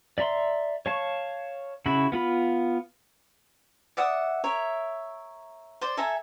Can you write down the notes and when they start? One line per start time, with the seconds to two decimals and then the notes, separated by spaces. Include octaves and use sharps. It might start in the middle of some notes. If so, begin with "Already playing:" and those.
0.18 D5 E5 A#5 C6
0.86 C#5 F5 A5 C#6
1.86 C#3 E4 F#4 B5
2.12 B3 F4 B5
3.97 D5 E5 F#5 D#6
4.44 A#4 C#5 E5
5.81 C5 D5
5.97 A4 E5 G#5 A#5